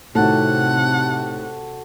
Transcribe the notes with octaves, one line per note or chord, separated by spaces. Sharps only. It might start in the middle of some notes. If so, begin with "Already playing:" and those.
A2 C3 D#3 F#4 A4 F#5